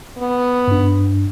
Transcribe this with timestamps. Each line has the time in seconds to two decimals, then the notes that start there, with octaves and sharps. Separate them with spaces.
0.17 B3
0.68 G2 D4